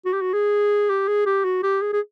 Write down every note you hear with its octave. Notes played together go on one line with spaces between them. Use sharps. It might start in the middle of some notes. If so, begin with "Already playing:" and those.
F#4
G4
F#4
G#4
G4
G#4
G4
F#4
G4
G#4
G#4